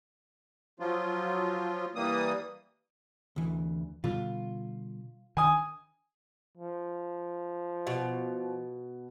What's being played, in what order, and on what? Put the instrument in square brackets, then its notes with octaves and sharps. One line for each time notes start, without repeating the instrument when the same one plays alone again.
[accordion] F3 F#3 F4
E3 G3 A#3 D#6
[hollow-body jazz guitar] D2 E3
[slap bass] B2 D3 G3 [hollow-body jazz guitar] F4
[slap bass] D#3 [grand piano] G#5 D#6
[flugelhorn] F3
[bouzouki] B2